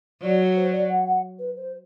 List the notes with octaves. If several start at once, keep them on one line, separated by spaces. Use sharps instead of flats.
F#3 D5
C5
D5
F#5
F#5
B4
C5